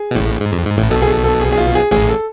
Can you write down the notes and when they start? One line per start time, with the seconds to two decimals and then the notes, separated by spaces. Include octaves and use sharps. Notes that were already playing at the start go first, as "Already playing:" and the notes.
Already playing: G#4
0.11 B2
0.15 A1 A2
0.40 G#2
0.53 F2
0.65 G#2
0.77 A1 A2
0.90 B1 B2 A4
1.02 G#4
1.08 A4
1.24 A4
1.41 G#4
1.52 G#4
1.58 F4
1.75 G#4
1.91 A1 A2 G#4
2.09 A4